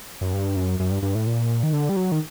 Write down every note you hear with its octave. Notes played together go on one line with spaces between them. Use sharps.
F#2
G2
F#2
F#2
G2
G2
A2
A#2
D#3
D3
G3
F#3
D#3